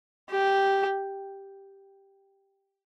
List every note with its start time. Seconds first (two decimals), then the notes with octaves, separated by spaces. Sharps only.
0.31 G4